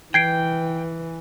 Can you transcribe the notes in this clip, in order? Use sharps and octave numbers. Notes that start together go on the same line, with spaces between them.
E3 G5 G#6 C7 D7